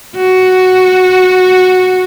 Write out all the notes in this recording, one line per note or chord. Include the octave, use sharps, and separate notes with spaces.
F#4